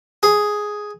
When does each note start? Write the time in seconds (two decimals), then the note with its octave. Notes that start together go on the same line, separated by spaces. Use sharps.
0.23 G#4